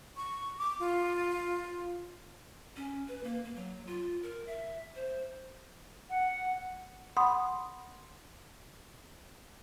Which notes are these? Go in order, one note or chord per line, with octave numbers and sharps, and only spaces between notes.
C#6
D6
F4
C#4
B4
A#3
A#3
F#3
F4
A#4
E5
C5
F#5
F#5 B5 C6 D#6